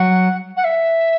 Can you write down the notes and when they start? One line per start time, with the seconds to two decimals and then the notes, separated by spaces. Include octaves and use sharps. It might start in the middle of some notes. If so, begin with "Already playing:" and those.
Already playing: F#3 F#5
0.57 F#5
0.65 E5